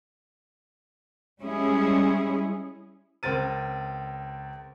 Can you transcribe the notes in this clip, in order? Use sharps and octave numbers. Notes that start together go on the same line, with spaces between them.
G3 G#3 C#4 E4 G#4
C#2 C4 A#4 A6 D#7